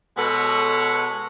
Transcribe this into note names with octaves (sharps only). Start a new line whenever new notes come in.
B2 G#3 A4 B4 C#5 F#5